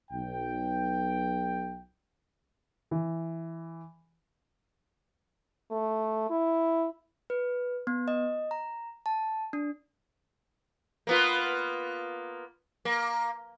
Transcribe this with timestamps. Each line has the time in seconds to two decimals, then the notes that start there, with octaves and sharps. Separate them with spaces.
0.11 B1 G5
2.91 E3
5.71 A3
6.30 E4
7.30 B4
7.87 B3
8.08 D#5
8.51 A#5
9.06 A5
9.53 D4
11.07 A#3 B3 F4
12.85 A#3